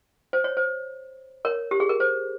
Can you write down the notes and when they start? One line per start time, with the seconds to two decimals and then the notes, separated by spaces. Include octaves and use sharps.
0.33 C5
0.44 C#5
0.57 C5
1.45 A#4 C#5
1.71 G4
1.80 G#4
1.89 A#4
2.00 C5